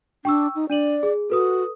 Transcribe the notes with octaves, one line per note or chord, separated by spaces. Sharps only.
D4 G5 C#6 E6
D#4
D4 D5 D#7 F#7
G#4
F#4 A4 B4 D#6